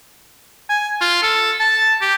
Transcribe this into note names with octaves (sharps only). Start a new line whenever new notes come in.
G#5
F4
A4
A5
G4